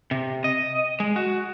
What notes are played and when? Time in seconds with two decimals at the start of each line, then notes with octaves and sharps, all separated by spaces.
0.11 C3
0.44 D#5
1.00 G#3
1.16 F#4